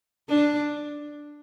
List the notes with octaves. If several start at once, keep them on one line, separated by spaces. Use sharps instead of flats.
D4